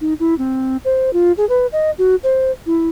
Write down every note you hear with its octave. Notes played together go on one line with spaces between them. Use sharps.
D#4
E4
C4
C5
F4
G#4
B4
D#5
F#4
C5
E4